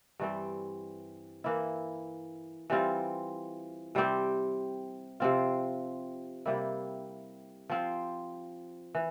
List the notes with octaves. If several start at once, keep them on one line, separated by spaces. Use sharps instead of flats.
G2 E3 G3 C4
E3 A#3 E4
E3 G3 C4 F4
C3 G3 C4 G4
C3 F3 C4 F4
C3 G3 A#3 E4
F3 C4 F4
E3